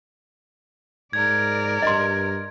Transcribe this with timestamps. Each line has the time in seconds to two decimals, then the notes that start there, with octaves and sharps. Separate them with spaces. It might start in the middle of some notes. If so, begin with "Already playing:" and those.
1.13 G#2 A#4 D5 G#6
1.82 G2 D#5 C6